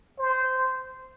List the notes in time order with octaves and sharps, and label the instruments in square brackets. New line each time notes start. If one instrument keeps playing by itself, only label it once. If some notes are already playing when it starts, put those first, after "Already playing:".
[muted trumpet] C5